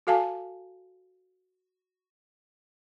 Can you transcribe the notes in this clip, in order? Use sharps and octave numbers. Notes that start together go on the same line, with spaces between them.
F#4 A4 F5 G#5 A5